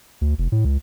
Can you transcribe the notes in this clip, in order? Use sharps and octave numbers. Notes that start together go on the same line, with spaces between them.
D2
F1
A2
C#2